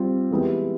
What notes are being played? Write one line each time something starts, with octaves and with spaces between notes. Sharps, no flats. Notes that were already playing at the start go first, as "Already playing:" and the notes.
Already playing: G3 C4 F4
E3 G#3 B3 E4 G4